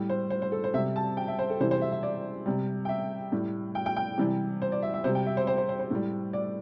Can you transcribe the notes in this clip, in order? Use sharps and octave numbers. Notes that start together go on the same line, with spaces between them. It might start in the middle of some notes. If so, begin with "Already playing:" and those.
Already playing: A2 G3
C5
C5
C5
A4
C5
C3 G3 E5
A5
G5
E5
C5
A4
C3 E3 G3 C5
C5
E5
E5
D5
C3 G3
G5
E5
A2 G3
G5
G5
G5
C3 E3 G3
C5
D5
E5
E5
C3 G3 C5
G5
E5
C5
C5
C5
C5
C5
A2 G3
D5